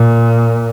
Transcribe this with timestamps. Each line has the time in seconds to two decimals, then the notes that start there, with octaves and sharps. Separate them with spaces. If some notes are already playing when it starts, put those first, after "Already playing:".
Already playing: A#2